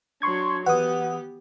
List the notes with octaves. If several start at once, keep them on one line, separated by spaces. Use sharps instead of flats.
F#3 D4 C6 C#6 G#6
E3 B3 G4 F#5 D#6